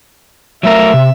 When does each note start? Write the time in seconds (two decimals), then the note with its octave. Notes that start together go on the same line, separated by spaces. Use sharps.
0.63 F#3 A3 A#4 E5
0.94 C3